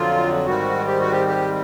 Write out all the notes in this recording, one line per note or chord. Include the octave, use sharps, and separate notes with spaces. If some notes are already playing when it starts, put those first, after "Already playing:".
Already playing: F2 D3 F#3 F4
G#2 D#3 G3 C4 F#4
G4
F#4
G4
G4